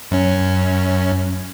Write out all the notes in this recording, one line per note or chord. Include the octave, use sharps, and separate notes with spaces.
F#2 C#4